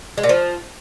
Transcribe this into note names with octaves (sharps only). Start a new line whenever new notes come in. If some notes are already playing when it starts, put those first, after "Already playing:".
G#3
A#2
F3